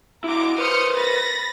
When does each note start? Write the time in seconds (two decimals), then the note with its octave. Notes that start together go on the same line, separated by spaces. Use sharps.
0.24 E4 F#4 A#5 D6
0.58 B4 C5 D#6 F6 C#7
0.95 B5 A6 A#6